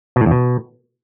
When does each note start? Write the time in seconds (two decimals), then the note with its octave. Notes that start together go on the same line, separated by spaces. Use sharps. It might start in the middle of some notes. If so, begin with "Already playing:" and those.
0.16 B2
0.21 A2
0.26 E2
0.31 B2